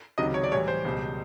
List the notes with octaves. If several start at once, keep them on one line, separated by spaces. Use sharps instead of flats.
C#2 C3 D#3 F#3 D#5
C#5
D5
A2 E3 G3 C#5
C5
C#2 B2 G3